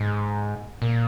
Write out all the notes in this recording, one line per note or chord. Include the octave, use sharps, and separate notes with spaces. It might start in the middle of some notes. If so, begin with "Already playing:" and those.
Already playing: G#2
A#2